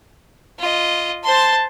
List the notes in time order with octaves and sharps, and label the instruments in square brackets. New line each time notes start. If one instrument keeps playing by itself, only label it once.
[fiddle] F4 D#5
[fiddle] C5 C6 [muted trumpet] A5